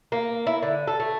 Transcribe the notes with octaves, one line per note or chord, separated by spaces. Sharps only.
A#3
E4
D3
A4
A3